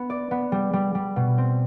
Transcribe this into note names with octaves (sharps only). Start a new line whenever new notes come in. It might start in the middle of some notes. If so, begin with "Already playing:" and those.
Already playing: B3
D5
B3
G3
G3
G3
B2
C4